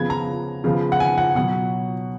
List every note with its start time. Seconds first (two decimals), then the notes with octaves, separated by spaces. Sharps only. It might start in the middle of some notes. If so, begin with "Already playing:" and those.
Already playing: C#3 F3 B3 G#6
0.10 A#5
0.64 C#3 F3 B3
0.92 F#5
1.00 G#5
1.18 F#5
1.35 B2 F#3 F#5